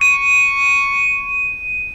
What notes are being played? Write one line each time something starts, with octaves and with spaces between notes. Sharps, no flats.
C#6 D#7